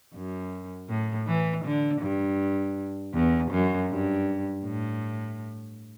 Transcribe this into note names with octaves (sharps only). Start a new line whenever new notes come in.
F#2
A2
E3
D3
G2
E2
F#2
G2
A2